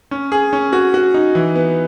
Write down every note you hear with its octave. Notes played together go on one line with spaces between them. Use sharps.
C#4
G#4
C#4
F#4
F#4
D#4
E3
B3